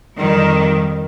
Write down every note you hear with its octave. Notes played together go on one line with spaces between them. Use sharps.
F2 D#3 G3